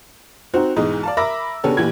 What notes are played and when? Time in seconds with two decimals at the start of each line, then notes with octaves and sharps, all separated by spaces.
0.54 C4 D#4 F#4 C5
0.77 B1 G#2 E3 G#3 D#5
1.03 D5 F5 A5
1.17 A#4 E5 B5 D6 E6 A#6
1.64 C#3 B3 C#4 D4 G4 A4
1.77 A#1 E3 G4 G#6